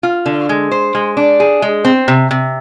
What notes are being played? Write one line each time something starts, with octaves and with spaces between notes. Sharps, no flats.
F4
D3
G#3
C5
G#3
D4
G#4
G#3
C4
C3
C3